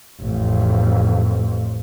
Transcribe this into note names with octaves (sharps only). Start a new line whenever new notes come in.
A1 F2